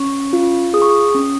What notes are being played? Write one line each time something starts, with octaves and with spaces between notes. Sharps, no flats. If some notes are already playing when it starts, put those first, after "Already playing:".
Already playing: C#4 C#6
F4
G#4 D#6
C#6
D#6
C#4